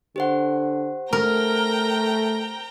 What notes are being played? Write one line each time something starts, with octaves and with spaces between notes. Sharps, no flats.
D3 G4 C5 F#5
A3 A#4 G5 A#5